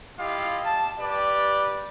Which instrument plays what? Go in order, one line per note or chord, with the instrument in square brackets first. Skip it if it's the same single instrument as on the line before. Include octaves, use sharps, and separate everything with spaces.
[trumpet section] E4 F4 G4 D#5 F5
A5
G4 B4 D5